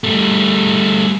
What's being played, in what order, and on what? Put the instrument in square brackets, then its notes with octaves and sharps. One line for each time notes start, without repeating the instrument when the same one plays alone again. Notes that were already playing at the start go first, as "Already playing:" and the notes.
[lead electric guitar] G3 A3